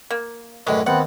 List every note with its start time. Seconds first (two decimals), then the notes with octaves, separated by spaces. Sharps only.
0.10 A#3
0.67 F#2 A2 D3 G#3 B4
0.86 D#2 B3 C4 F#5